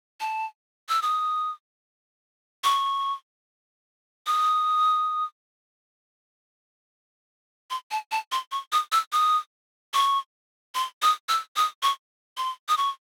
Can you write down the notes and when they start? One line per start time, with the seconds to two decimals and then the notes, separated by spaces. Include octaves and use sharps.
0.21 A5
0.89 E6
1.02 D#6
2.64 C#6
4.27 D#6
7.70 C6
7.91 A5
8.12 A5
8.32 C6
8.52 C#6
8.72 D#6
8.92 E6
9.12 D#6
9.94 C#6
10.75 C6
11.02 D#6
11.29 E6
11.56 D#6
11.83 C#6
12.37 C6
12.69 D#6
12.77 C#6